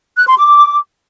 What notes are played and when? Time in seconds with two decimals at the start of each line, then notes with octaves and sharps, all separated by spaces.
0.16 F#6
0.27 C6
0.37 D6